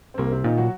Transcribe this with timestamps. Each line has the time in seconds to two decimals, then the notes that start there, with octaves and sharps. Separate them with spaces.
0.14 C4
0.18 C2 A#3
0.32 C3 C4
0.44 A#2 D#3 D#4
0.58 F#3 F#4